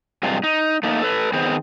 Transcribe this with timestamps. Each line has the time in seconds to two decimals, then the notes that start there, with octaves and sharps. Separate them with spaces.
0.23 G2 C3 G#3 F4
0.43 D#4
0.83 A3 A#3 D#4
1.02 A4 B4
1.33 D#3 B3 C4 G#4 C5